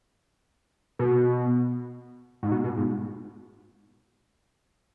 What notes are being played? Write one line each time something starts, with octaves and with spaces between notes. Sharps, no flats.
B2
G#2
B2
B2
G#2